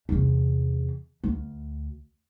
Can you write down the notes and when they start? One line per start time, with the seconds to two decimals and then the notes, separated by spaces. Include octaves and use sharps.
0.09 E2 C3
1.24 D2